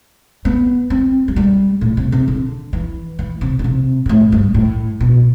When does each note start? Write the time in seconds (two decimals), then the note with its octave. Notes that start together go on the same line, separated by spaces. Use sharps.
0.45 B3
0.90 C4
1.28 F#3
1.36 G3
1.81 A2
1.97 C3
2.12 C3
2.28 D3
2.73 E3
3.19 E3
3.41 C3
3.59 D3
3.64 C3
4.06 B2
4.09 A2
4.32 G2
4.54 A2
5.00 B2